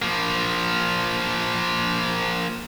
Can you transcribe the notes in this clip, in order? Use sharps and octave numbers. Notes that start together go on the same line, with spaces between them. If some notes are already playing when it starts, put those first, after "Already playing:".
F3 A#3